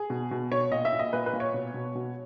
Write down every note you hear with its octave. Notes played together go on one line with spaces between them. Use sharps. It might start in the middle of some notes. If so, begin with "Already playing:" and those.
Already playing: G#4
B2
B2
B2 C#5
A#2 D#5
E5
A#2
D#5
A#2 B4
B4
A#2
C#5
B2
B2
B2